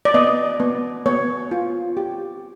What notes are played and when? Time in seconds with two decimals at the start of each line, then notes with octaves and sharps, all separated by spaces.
0.05 D5
0.14 B3 D#5
0.60 B3
1.06 B3 C#5
1.51 F4
1.97 G4